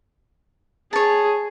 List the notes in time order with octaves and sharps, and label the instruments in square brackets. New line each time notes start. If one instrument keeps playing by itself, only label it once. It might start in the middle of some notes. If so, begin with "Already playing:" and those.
[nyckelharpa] G#4 [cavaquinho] C#5 A5